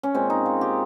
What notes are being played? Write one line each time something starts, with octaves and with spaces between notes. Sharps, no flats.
C#4
A#2 G#3 C4
D#4
F4
G4